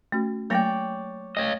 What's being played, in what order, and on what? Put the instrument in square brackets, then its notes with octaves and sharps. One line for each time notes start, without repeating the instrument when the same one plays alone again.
[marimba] A3 C#4 F#4
[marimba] F#3 A3 A#3 [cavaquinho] C#5 D5 G5
[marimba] A3 [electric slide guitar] C#5 D#5